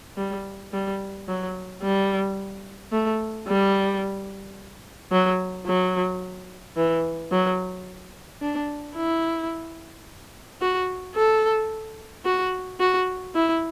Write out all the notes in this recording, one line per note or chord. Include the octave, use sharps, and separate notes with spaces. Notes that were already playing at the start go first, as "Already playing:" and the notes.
G3
G3
F#3
G3
A3
G3
F#3
F#3
E3
F#3
D4
E4
F#4
A4
F#4
F#4
E4